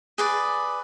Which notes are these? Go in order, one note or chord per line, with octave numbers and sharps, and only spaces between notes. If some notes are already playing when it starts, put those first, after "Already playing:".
G#4 B4 D5